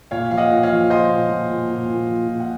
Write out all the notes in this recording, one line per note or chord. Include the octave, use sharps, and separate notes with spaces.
A#2 C#5 F5
F3 F5
D#5 F#5
A#2
C#5 F5
F3
F3 C5 D#5
A#2
A#2
A#2
A#2
A#2
F3
A#2
F#5